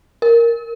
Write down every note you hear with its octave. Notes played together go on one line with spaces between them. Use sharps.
A#4